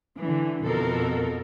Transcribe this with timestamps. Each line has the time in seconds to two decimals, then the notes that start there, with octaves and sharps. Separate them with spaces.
0.21 D3 E3
0.64 F2 B2 A4 A#4